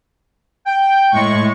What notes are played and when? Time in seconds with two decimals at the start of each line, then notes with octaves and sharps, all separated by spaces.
0.66 G5
1.13 A2 G#3 C#6